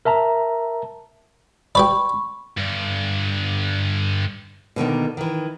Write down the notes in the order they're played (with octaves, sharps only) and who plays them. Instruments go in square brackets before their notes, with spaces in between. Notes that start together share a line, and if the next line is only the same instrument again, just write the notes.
[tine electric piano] A#4 E5 A5 A#5
[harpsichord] G4 B4 D5 [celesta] B5 C#6
[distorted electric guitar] G2 D3
[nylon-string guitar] B2 D3 D#3 A#3
D#3 E3